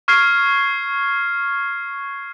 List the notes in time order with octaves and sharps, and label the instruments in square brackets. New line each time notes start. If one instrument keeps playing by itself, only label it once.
[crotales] C#6 F6 G#6 C7